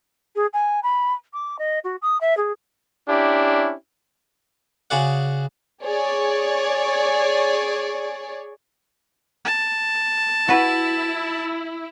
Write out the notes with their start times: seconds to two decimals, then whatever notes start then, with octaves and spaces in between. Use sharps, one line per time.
0.36 G#4
0.53 G#5
0.83 B5
1.33 D6
1.59 D#5
1.84 F#4
2.02 D#6
2.21 E5
2.37 G#4
3.08 C#4 D4 E4 G4
4.90 C#3 F#4 G#4 D5 F#5
5.84 G#4 C#5 D5
9.45 A5
10.48 E4 F#4 B4